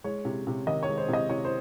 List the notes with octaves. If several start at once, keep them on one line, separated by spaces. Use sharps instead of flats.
G#3 C#5
C3
C3
D#3 D#5
C#5
G#3
C5
C3 D#5
C3 C#5
C5